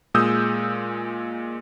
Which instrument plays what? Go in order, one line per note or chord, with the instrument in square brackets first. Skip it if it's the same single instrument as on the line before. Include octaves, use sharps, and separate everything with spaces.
[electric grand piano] A#2 G#3 D#6 E6 G6